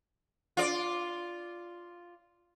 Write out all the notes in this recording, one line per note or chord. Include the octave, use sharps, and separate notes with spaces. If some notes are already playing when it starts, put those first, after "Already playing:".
F4 D5